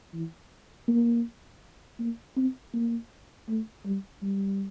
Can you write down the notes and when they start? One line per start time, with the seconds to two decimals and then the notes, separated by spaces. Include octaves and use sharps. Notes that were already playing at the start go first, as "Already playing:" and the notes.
0.14 E3
0.88 A#3
1.99 A#3
2.36 C4
2.74 A#3
3.49 A3
3.85 G3
4.23 G3